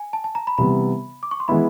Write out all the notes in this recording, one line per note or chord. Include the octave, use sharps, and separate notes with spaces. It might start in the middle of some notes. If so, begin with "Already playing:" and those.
Already playing: G#5
A5
A5
A#5
B5
C3 E3 G3 B3 B5
D6
C#6
C6
E3 G#3 B3 E4 B5